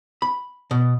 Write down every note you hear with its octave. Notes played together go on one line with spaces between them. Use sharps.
B5
B2